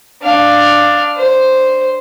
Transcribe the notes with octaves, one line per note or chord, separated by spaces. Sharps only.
D4 F5
C5